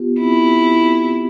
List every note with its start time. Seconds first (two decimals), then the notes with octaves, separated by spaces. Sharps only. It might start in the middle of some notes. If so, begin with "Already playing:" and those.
Already playing: B3 F4 G4
0.20 C4 E4